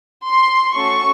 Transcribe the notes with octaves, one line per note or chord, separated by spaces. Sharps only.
C6
A3 C#4 F#4 A4 C#6